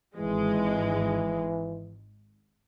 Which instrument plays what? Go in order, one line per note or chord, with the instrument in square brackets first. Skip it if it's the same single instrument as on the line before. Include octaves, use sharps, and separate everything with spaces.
[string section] G#1 G#2 G#3 [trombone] E3